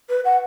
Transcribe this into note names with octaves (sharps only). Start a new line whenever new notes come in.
B4
F#5